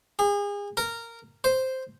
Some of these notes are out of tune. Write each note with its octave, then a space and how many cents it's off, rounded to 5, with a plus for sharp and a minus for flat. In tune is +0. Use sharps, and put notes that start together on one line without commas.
G#4 -35
A#4 -15
C5 +0